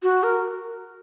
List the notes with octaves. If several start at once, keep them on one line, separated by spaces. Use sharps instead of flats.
F#4
A#4